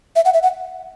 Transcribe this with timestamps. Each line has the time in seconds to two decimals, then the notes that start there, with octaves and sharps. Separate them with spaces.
0.16 E5
0.25 F#5
0.34 E5
0.43 F#5